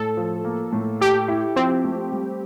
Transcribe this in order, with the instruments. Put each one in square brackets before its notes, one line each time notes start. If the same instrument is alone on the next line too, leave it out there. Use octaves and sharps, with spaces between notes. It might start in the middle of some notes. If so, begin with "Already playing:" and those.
Already playing: [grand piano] A2 [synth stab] A4
[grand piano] F3
A#3
A2
[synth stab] G4 [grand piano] A4
[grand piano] E4
[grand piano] F3 [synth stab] C4
[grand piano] A3
G3